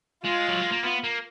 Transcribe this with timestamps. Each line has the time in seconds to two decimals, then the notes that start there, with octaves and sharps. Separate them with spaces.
0.24 G#3 F4
0.48 F#3
0.60 G#3
0.72 A#3
0.83 B3
1.04 A#3